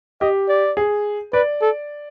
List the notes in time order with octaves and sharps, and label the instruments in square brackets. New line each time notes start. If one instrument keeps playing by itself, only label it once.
[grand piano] G4 [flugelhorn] D#5
[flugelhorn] D5
[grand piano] G#4
[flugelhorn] B4 [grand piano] D5
[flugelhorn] A4